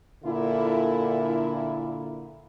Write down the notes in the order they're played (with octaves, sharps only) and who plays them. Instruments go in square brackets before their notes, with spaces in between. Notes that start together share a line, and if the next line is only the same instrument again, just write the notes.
[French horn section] A#2 D3 E4